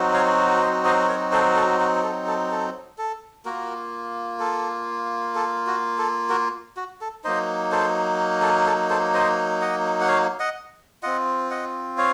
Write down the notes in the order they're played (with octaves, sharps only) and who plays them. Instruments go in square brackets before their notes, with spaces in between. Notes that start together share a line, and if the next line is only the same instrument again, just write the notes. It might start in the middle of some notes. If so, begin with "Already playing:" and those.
Already playing: [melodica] F#3 C4 D#4 F#4
C#5 F5
C5 D#5
C5 D#5
A#4 C#5
A4 C5
A4
F#4
A4
A4
A4
A4
A#3 F4 F#4 A#4
A4
A4
F#4
A4
F#4 A#4
F#4
A4
F#3 A#3 D#4 C5 D#5
A4 C5
A4
A4
A4 C5
C5 D#5
D#5 F#5
F#5
C#5 F5
D#5 F#5
C4 F4 D#5 F#5
D#5 F#5
C#5 F5